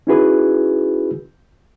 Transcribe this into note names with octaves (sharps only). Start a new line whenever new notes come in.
C#4 D#4 E4 F#4 G#4 B4